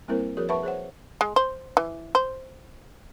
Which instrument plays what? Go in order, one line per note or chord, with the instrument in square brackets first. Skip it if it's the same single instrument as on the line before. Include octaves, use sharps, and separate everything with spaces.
[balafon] G3 A#3 C4 E4 A#4 C5
F3 F#4 G#4 A#4 C#5
B4 E5 F#5 A5 B5 C#6
G#4 C5 C#5 F#5
[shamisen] G#3
C5
E3
C5